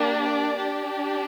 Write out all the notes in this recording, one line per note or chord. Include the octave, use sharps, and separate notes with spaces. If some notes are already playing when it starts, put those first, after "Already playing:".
Already playing: A#3 D4 G4
D5
D4 G4